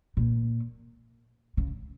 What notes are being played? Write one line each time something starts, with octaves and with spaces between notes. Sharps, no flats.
A#2
C#3